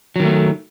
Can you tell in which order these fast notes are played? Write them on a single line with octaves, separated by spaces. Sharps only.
F#3 D#3 A3